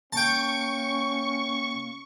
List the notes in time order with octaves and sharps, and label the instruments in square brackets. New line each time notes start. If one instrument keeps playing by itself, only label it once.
[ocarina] A#3 [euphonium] C#4 [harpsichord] G5 A5 [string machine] C#6